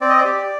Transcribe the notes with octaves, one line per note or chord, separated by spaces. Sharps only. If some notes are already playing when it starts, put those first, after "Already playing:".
C4 D5
D#5
D5
G4